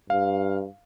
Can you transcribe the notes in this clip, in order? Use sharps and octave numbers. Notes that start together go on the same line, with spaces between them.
G2 F5